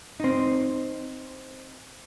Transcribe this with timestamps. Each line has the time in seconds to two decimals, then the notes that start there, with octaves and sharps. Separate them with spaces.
0.20 C4 D#4